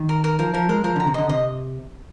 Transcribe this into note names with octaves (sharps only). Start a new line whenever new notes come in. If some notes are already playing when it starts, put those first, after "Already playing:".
Already playing: D#3
A#4
A#4
F3 A#4
F3 A#4
G#3 A#4
F3 A#4
D3 A#5
C3
D3 D#5
C3 D#5